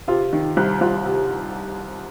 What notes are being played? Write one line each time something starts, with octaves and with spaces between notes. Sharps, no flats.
C3 F4
D#3
C2
C2 F4
C3